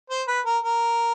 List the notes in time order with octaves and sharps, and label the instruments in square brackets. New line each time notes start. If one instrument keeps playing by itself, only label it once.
[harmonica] C5
B4
A#4
A#4